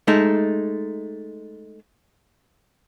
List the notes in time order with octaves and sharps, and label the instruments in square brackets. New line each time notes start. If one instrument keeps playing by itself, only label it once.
[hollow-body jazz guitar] G#3 A3 D#4